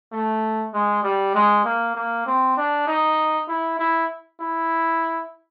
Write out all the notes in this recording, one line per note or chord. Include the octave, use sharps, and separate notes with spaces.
A3
G#3
G3
G#3
A#3
A#3
C4
D4
D#4
E4
E4
E4